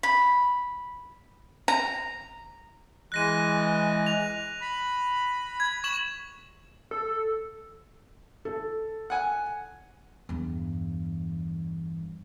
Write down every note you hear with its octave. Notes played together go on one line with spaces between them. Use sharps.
B5
A#5
E3 G#3 F#6 A#6 D#7
F7
B5
G#6
C#6 E7 F#7
A4
A4
F#5 G#5
E2 G2